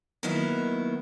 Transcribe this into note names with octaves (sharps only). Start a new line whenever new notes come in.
D#3 F#3 A#3 B3 D#4 E4